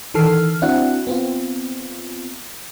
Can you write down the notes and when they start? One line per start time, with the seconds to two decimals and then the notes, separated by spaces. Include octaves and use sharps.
0.14 D#3 E3 A4 F6 C7
0.62 C4 D4 E4 F#4 F#5
1.07 B3 C4 F4